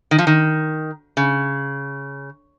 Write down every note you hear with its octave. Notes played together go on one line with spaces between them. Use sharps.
D#3
F3
D#3
C#3